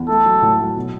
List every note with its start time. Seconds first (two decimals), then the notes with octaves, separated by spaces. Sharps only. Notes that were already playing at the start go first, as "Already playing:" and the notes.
Already playing: E2
0.08 A3 A4
0.25 F#3
0.42 A2
0.59 F#3
0.76 B2